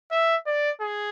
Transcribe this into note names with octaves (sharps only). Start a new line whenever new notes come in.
E5
D5
G#4